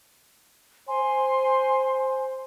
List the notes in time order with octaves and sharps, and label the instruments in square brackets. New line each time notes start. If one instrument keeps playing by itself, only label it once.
[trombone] C5 [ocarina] G#5 [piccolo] C6